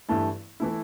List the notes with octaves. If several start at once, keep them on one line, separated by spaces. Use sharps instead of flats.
G2 E3 A3 E4
E3 A3 E4